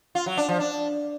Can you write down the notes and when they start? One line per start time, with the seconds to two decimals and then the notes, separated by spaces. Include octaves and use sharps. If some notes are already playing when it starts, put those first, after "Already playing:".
0.15 F4
0.26 F#3
0.37 D4
0.48 F3
0.60 D4